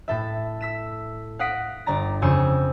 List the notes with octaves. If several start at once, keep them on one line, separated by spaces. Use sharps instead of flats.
A2 A4 E5
E6 B6 E7
F5 F#5 D#6 A#6 B6 D7
G1 D5 A#5 A#6
F2 C#3 C5 G#5 E6 C#7